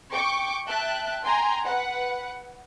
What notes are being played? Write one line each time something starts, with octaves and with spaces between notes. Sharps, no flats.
G5 C#6 D6
E5 G5 A5 F#6
G5 G#5 A#5 C6
B4 F#5